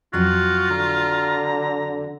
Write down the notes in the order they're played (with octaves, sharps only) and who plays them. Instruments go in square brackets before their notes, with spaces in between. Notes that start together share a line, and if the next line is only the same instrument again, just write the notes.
[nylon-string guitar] F2 F#3 [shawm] F4 [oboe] F#4
[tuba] D3 [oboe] A#5